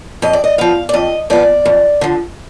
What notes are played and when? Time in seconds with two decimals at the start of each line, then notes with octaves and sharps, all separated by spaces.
0.22 F2 D#5
0.33 D5
0.44 D#5
0.58 F3 B3 F5
0.89 D5
0.93 F2 D#5
1.30 F3 B3 D5
1.65 F2
2.01 D3 F3